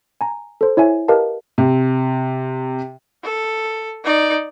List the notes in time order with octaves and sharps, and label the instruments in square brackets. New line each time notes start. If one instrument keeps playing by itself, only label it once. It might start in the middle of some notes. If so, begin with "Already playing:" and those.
[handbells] G#5 A#5
A4 C5
E4 C#5 E5 G#5
G4 A#4 B4 D#5 F5 A5
[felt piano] C3
[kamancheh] A4
D#4 D5